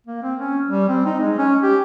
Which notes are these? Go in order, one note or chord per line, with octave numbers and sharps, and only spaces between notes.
A#3
C4
C#4
G3
C4
D#4
G#3
C#4
G4